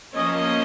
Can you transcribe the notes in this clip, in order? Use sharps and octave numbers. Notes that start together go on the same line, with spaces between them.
F3 A#3 C#4 D#5